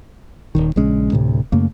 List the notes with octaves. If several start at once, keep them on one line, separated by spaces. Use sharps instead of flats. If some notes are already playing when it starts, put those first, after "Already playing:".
D#1 B1 D#3
A#1 C#3 G#3 C#4
D2 A2 C3
F#2 C#3 A3 A#3